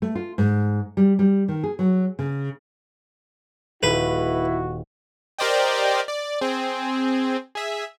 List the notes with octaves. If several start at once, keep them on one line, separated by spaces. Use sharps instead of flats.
A3
F4
G#2
G3
G3
D#3
G#4
F#3
C#3
D#1 E4 F#4 B4
G4 A#4 C5 D5 D#5 G5
D5
C4 G#4
G#4 E5